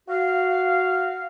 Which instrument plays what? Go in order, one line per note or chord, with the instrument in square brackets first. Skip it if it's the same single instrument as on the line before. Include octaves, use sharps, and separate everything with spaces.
[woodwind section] F#4 F5